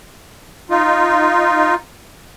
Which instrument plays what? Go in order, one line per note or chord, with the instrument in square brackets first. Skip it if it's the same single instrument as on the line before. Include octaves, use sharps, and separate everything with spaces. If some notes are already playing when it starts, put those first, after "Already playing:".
[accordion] D#4 F4